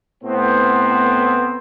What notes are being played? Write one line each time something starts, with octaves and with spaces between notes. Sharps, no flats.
A2 B3 C4